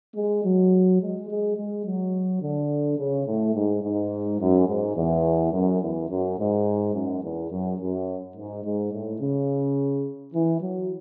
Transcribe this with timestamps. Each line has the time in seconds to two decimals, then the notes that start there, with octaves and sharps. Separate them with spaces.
0.16 G#3
0.45 F#3
1.02 G#3
1.30 G#3
1.57 G#3
1.86 F#3
2.42 D3
2.99 C#3
3.27 A2
3.56 G#2
3.84 G#2
4.41 F#2
4.68 G#2
4.97 E2
5.53 F#2
5.82 E2
6.10 F#2
6.39 G#2
6.95 F#2
7.24 E2
7.52 F#2
7.80 F#2
8.37 G#2
8.65 G#2
8.93 A2
9.21 C#3
10.35 E3
10.62 F#3